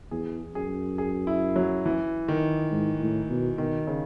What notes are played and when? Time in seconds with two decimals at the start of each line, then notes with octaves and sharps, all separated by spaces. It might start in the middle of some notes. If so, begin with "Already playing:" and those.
0.11 E2 G#4
0.55 F#2 G#4
0.98 G#4
1.27 E4
1.56 F#3
1.85 E3
2.28 D#3
2.72 G#2
3.01 A2
3.30 B2
3.58 B2 D#3
3.87 C#3